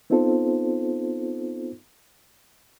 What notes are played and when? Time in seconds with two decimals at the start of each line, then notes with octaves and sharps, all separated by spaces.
0.10 B3 C4 D#4 F4 A4 C5